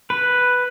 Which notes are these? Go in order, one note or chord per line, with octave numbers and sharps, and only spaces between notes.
B4